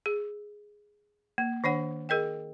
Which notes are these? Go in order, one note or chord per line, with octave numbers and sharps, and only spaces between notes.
G#4
A#3
D#3 D4 C#5 F#5
G#4 A#4 D#5 G5